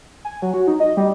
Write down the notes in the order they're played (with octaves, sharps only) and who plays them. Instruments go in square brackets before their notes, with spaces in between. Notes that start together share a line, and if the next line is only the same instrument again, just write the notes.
[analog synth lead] G#5
F#3
F#4
D#4
D#5
G3